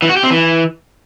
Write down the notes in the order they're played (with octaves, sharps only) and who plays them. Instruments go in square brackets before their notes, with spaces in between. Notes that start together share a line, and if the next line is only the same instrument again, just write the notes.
[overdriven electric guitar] E3
F#4
G4
C4
E3